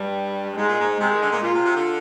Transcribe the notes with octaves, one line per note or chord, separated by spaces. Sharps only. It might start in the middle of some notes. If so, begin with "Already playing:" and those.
Already playing: G2 G3
G#2 G#3
A#2
G#2
C3 G#3
D#3
D3
A#2
A#2 F4
C3
C3
D3